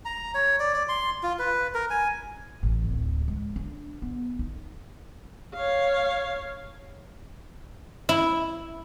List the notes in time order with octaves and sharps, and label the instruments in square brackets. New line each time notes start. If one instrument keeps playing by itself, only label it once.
[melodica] A#5
C#5
D5
D5
C6
F4
B4
A#4
G#5
[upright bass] A1
D1
G#3
D4
B3
D#4
[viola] C#5 F5
[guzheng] E4